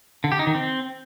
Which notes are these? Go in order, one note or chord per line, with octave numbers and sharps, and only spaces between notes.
D3
G4
D#4
D#3
C4